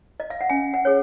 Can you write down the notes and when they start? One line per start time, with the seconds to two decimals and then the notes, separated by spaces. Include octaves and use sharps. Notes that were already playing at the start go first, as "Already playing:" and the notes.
0.20 D#5
0.30 F5
0.41 F#5
0.50 C#4 G#5
0.74 F#5
0.85 G#4 C#5